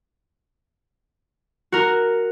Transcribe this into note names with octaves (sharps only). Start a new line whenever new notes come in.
F#4 A#4